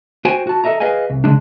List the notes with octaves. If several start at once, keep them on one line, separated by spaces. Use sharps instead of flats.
F#4 C5 G5 G#5
F#4 A5
A4 A#4 D#5 E5 A#5
G#4 B4 D#5 F5 G#5
C2
C#3 G#3 D4